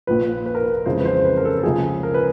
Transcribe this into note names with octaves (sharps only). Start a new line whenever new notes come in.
A#1 A#2 F3 B4
B4
A#4
B4
F2 C#3 E3 G#3 C5
B4
C5
B4
A#4
A4
A4
C#2 C#3 F3 G#3 G#4
A#4
B4